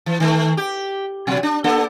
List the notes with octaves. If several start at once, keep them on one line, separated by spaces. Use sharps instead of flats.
E3
D#3 A3
G4
B2 F#3
D4
A#3 D4 A4